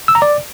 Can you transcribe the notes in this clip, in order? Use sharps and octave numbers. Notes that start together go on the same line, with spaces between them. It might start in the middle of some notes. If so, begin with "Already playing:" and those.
E6
A#5
D5